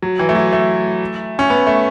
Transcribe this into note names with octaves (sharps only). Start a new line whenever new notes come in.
F#3
E3
A3
F#3
A3
C#4
B3
A3